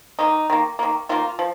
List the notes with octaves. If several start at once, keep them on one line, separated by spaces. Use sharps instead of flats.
D#3 A#3 D#4
D#3 A#3
D#3 A#3
D#3 A#3 F4
F3